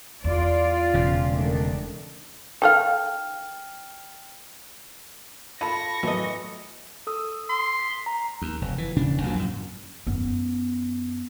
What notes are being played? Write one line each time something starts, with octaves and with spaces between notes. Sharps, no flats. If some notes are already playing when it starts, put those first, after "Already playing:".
E2 F4 D5
E1 C#3
D#3 A3 D4
D#4 A4 F5 G5 F6
F4 A4 A5 B5 C#6 A#6
E3 F#3 A3 D#5
A4 D#6 E6
C6
B6
A#5
D#2
F1
E3
E1 C#3 D4
A#1 A#2 D#3 F#3
F#2 A2
F#2 B3